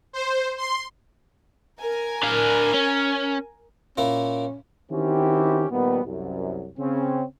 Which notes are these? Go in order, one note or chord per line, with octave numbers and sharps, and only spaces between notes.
C5
C6
A#4 G#5
D4 F5
C#4
A#2 A#3 C#4 E4
D#3 C4 C#4 E4 F#4 G4
A#2 D#3 F3 G3 B3
C2 F#2
C#3 C4 C#4